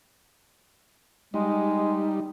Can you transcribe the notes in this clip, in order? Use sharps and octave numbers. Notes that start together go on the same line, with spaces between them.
G3 G#3 D#4